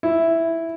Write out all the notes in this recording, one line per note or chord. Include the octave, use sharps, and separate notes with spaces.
E4